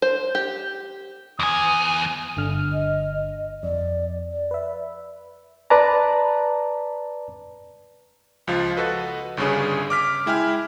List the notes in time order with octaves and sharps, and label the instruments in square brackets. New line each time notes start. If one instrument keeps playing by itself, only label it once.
[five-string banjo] C5
G4
[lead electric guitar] E2 G#5 [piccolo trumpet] D#6
[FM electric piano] G1 D3 F6
[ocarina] D#5
[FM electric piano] F2 [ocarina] D5
[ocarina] D5
[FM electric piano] B4 E5
[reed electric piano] B4 D5 A5 A#5
[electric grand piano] C#2 F3 F4
F#4 A4 B4 D#5
G1 G2 C#3 C#4 G#4
D6 F6 B6
G#3 E4 G5 G#5 F6